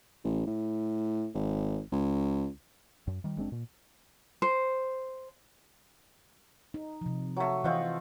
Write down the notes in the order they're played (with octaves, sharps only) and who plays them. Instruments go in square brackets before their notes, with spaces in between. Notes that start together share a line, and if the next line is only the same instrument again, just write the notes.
[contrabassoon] A1
A2
G#1
C#2
[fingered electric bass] F#2
D#3 G3
F#1 G#3 C4 D4
A#2
[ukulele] C5
[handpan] D#4
C3 F3
[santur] F#3 A3
[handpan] E3 D#5 [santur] C4 F4 F#5